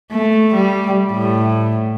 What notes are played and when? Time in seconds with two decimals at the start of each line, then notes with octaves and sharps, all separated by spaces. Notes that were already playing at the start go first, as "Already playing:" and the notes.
0.12 A3
0.54 G3
1.12 A2